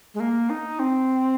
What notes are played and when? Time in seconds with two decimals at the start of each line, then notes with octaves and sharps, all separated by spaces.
0.14 G#3
0.20 A#3
0.50 D#4
0.79 C4